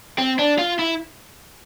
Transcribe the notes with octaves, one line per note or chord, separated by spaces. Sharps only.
C4
D4
F4
E4